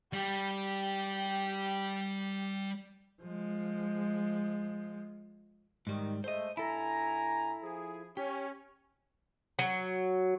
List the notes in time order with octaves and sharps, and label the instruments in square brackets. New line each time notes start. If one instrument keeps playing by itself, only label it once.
[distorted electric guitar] G3 [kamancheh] G4
[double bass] F3 G#3
[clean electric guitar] G#2 G3 [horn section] D#3
[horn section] G#3 A3 [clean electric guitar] C5 D#5
[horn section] G2 G#5 A#5 [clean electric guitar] E4 A4
[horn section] F3 G#4
[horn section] C#4 [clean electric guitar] G4
[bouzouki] F#3